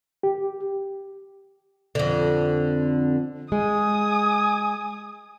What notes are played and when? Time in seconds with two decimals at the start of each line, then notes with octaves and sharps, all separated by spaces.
0.23 G4
1.95 F2 D3
3.52 G#3 G#5 D#6